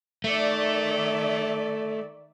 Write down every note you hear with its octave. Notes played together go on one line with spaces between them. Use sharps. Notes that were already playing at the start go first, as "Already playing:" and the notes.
D#3 A3 D5 E5